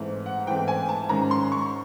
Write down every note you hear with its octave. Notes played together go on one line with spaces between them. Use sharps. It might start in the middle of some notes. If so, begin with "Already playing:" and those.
Already playing: G#2 E3 A3 C4
F#5
G#2 E3 A3 C4 G5
G#5
A5
G#2 D#3 G#3 C#4 A#5
C6
C#6